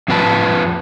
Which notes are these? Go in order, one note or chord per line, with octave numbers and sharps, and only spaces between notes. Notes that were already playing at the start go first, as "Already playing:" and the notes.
F2 C4 F4 B4 A5